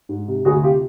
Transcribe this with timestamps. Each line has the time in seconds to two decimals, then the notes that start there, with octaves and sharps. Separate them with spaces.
0.09 G#2
0.28 C3
0.45 D2 F#4 G#4
0.63 C3 F4 G4